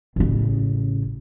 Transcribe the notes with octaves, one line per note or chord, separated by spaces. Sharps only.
A1 C#3